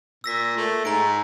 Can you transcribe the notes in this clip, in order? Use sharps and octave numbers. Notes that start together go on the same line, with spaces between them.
A#2 E6 A#6 B6
A3
G#2 A#5 D7